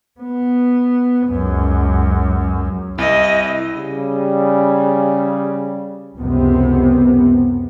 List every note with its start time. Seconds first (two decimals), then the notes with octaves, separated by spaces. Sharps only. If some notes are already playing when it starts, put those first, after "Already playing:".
0.21 B3
1.28 C#2 F#2
2.98 C2 E4 D#5
3.77 C#3 G3
6.17 C#2 F#2 C3 B3